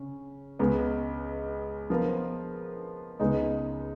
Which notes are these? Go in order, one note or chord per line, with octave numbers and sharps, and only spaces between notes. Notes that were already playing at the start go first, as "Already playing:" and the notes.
Already playing: C#3 C#4
C#2 C#3 G#3 B3
F3 B3 F4 A#4
C#2 C#3 G#3 B3 D#4